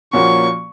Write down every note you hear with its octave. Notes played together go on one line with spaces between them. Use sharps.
A#2 F3 A#3 C#4 F#4 C#6